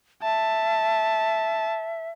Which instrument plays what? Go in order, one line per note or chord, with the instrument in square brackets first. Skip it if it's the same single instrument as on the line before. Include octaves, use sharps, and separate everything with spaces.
[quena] E5 [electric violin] A5